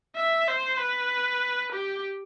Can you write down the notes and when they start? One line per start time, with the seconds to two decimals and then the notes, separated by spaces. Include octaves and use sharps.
0.16 E5
0.48 C5
0.78 B4
1.72 G4